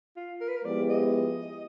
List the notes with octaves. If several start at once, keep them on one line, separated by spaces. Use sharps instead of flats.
F4
A#4
B4
A#4
F3 G#3 B3 E4 G4 D5
D#5